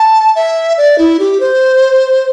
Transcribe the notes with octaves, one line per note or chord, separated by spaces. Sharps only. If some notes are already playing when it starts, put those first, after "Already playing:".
Already playing: A5
E5
D5
E4
G4
C5